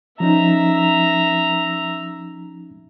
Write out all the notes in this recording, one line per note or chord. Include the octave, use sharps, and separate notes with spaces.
F3 C#4 D#4 E5 A#5